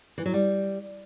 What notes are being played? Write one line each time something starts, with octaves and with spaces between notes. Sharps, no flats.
E3
F#3
G3